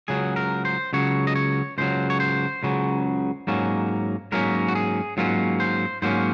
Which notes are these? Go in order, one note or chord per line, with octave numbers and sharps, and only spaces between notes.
C#2 C#3 F#3 G#4
A#4
C5
C#2 C#3 F#3 C#5
D#5
C#5
C#2 C#3 F#3 C5
C#5
C5
C#2 C#3 F#3
G#2 F#3 A#3 C#4
G#2 F#3 A#3 C#4 A#4
F#4
G#4
G#2 F#3 A#3 C#4 F4
C5
G#2 F#3 A#3 C#4 C5